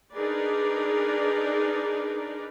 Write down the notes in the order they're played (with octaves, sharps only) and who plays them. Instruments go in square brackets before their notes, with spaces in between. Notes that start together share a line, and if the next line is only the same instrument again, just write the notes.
[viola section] D4 D#4 G#4 A#4 B4 D5